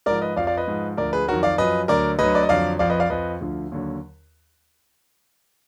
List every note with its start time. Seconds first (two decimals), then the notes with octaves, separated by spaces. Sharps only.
0.06 G#2 F3 A#4 D5
0.21 B4 D#5
0.36 F2 F3 D5 F5
0.47 D5 F5
0.57 B4 D#5
0.68 G#2 F3
0.97 D2 D3 F3 A#4 D5
1.13 G#4 B4
1.28 F2 D#3 F#3 F#4 A#4
1.43 D5 F5
1.58 F#2 F3 B4 D#5
1.88 D2 D3 F#3 A#4 D5
2.19 D2 D3 F#3 B4 D#5
2.35 D5
2.43 D#5
2.49 F2 D3 F#3 D5 F5
2.79 F2 F3 D5 F5
2.90 B4 D#5
3.00 D5 F5
3.10 F2 F3 B4 D#5
3.41 D2 D3 F3
3.72 D#2 D3 F#3